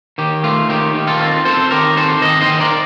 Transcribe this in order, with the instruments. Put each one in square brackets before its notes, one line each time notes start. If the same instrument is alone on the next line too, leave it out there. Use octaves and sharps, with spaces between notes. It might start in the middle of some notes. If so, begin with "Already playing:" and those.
[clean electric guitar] D#3 G4
A3 F4
D#3 G4
D#3
F4 A4
C4
C4 A4 C5
D#3 G4 A#4
C4 A4 C5
D#3 C5 D#5
C5 D#5
D#3
A#4 D5